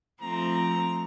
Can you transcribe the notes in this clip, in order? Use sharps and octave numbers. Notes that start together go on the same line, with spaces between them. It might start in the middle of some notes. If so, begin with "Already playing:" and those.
F3 A3 C4 A#5